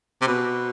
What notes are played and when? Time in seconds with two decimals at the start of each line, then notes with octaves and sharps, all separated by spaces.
0.21 C3
0.27 B2